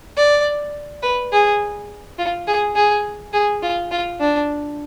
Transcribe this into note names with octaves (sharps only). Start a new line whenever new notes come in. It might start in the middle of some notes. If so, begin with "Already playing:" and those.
D5
B4
G#4
F4
G#4
G#4
G#4
F4
F4
D4